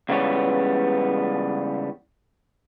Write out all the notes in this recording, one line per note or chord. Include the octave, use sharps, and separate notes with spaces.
C#2 C#3 E3 G3 B3 C#5